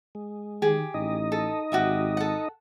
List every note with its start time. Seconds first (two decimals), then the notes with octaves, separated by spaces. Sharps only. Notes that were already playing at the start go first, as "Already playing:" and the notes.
0.15 G#3
0.62 D#3 G4 G#4
0.94 A1 D#4 D#5
1.32 A4
1.72 G#1 F#4 G4 E5
2.17 A4 F#5